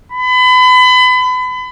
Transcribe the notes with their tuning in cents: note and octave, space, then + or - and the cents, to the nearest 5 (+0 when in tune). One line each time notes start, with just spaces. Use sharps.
B5 +35